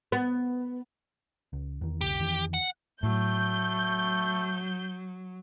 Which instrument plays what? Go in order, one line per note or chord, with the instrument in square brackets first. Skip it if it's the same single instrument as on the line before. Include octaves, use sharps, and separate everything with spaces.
[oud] B3
[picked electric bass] C#2
E2 D#3
[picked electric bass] F1 C2 D3 [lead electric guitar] G4
[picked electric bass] F2 D#3 E3
[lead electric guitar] F#5
[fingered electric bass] A2 [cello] F#3 [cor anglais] A3 [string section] G6